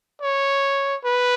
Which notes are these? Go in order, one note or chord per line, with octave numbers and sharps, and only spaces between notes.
C#5
B4